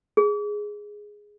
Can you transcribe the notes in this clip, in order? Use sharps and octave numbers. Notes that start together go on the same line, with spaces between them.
G#4